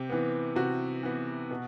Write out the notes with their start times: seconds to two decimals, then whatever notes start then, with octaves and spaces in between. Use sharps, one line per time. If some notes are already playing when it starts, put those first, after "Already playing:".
Already playing: C3 G4
0.09 E3 B3
0.56 C3 F#4
1.03 E3 B3
1.51 B2